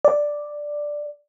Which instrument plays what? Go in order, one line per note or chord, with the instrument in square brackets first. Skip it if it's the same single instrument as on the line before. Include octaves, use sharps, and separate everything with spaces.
[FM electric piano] D5